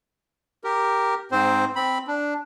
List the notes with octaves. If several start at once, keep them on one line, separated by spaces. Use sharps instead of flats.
G4 A#4
G#2 C4 C5
C4 B5
D4